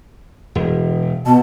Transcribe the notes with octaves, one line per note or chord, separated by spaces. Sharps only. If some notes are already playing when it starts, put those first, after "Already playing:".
E1
B2 B3 A5